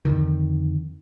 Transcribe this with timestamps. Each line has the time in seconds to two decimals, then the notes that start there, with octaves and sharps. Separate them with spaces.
0.05 F2 B2 D3 D#3